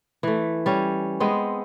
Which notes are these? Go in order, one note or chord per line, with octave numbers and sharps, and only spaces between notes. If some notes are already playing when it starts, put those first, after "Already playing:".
E3 A3
G3 C#4
G#3 B3 C4 D#5